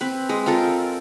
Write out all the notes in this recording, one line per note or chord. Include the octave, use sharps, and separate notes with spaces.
C4 B4
G#3 D#5
C4 F4 A4 A#4